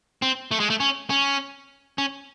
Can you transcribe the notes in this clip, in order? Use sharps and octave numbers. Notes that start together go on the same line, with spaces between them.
C4
A3
G#3
A3
C#4
C#4
C#4